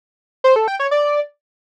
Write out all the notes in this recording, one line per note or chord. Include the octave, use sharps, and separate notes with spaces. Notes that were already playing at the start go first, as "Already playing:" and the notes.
C5
A4
G5
C#5
D5